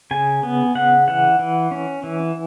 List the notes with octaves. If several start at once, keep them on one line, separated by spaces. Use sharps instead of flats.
C#3 G#5
B3
C#3 F#5
E3 F#5
E3
C#4
E3